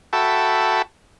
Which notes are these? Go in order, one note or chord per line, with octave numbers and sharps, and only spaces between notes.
F#4 A4 E5 G5 A5 B5